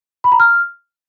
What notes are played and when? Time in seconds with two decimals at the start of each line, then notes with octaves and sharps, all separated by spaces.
0.24 B5
0.32 A#5
0.40 F6